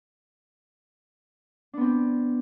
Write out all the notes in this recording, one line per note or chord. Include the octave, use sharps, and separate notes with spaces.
B3 C4 D4